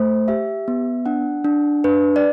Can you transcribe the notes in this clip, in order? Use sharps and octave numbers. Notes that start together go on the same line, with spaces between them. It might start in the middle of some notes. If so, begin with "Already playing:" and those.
Already playing: A3 C5
G4 E5
B3
D4 F#5
D4
D4 B4
D5